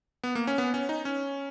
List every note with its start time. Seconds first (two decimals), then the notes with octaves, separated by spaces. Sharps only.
0.24 B3
0.35 A#3
0.47 C#4
0.58 B3
0.74 C#4
0.89 D#4
1.05 C#4